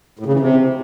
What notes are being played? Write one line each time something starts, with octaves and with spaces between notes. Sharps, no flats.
A2
C#3
E3
C3